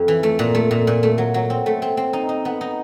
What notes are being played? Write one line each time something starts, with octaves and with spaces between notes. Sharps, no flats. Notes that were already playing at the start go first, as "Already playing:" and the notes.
Already playing: F2
E3
A3
A#2
A3
A#2
A#2
A3
F#3
F#3
C4
A3
C4
C4
D#4
D#4
B3
D#4